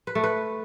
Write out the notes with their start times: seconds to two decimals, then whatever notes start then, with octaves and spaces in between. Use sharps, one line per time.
0.07 B4
0.15 A3
0.24 B4